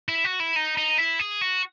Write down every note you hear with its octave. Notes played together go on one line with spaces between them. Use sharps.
E4
F#4
E4
D#4
D#4
E4
G#4
F#4